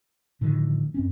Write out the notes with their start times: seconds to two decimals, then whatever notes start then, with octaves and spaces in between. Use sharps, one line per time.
0.41 A2 D3 D#3 F3
0.94 F#2 C4 C#4